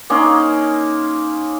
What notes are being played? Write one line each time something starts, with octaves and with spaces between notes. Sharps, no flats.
A#3 C#4 D#4 C5